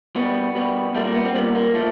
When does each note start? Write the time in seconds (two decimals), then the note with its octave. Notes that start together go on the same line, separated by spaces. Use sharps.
0.16 B2 G3 B3
0.55 B2 G3
0.95 A#2 G3 A3
1.04 A#3
1.14 B3
1.25 C4
1.35 A#2 G3 B3
1.55 A#3
1.74 A#2 F3 A3